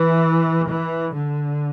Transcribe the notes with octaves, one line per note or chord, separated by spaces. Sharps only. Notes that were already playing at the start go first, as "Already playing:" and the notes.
Already playing: E3
E3
D3